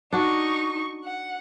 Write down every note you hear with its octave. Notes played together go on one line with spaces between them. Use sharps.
D4 D#4 F#4 C#6
F#5